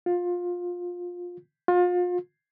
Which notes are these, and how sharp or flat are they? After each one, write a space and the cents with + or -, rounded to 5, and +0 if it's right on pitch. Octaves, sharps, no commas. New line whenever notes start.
F4 +20
F4 +35